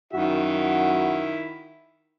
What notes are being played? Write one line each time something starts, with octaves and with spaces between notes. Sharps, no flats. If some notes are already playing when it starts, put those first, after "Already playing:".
F#2 D#3 E4 F#4 E5